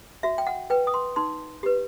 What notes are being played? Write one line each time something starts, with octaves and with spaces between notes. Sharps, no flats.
F#4 E5
G5
F#5
B4 G5
D#6
C6
D#4 C6
G4 B4